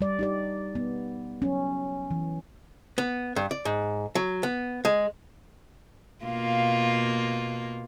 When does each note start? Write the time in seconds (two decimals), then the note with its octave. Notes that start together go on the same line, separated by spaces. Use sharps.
0.01 G3 D5
0.19 D#4 G4 D5
0.75 B3
1.42 F#3 C#4
2.11 E3
2.98 B3
3.36 G2
3.51 D5
3.65 G#2
4.15 F#3
4.43 B3
4.85 G#3
6.25 B2 A#3 F4